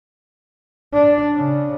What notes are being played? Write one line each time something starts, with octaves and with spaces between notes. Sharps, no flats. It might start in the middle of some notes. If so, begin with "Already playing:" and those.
D4
C#3